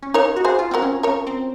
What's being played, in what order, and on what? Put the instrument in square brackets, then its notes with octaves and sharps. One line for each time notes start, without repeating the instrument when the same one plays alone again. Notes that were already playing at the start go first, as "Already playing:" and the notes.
[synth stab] C#4
[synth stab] D#4 [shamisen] A#4 C#5
[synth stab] F#4
[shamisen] G#4 C5
[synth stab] F4
[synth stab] C4 [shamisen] F#4 A#4
[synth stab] C#4
[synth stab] C#4 [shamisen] A#4 C#5
[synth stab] C4